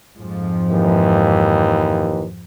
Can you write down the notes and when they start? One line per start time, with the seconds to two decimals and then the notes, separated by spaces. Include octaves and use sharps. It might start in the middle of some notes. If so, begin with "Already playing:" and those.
0.17 F2 G#2 F3
0.70 D#2 E3